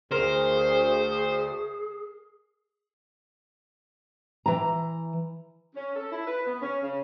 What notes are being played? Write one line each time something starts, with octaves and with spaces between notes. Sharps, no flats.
D2 G#4 A#4 C5
E3 A#5
C#4
A4
E4
B4
B3
C#4
C#3